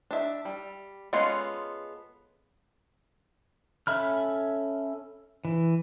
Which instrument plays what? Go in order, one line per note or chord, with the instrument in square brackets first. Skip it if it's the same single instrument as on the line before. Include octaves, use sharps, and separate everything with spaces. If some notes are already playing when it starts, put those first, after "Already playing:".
[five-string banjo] D4 E5
G3
G#3 B3 C#4 F4 A4
[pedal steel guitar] C#4 A4 E5 B5 F6
E3